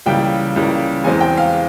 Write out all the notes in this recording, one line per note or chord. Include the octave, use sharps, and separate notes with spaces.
C#2 C#3 E3 G3 A#3 G5
C#2 C#3 E3 G3 A#3
E1 E2 E3 G#3 C4 G#5
G5
F5